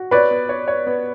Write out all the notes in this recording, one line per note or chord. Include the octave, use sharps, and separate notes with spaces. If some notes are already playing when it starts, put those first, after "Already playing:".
Already playing: F#4
B4 C#5 D5
B3
C#5
C#5
B3